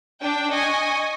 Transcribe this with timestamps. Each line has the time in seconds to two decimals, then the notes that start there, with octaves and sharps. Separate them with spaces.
0.21 D4 G5
0.52 D#5 G#5 C#6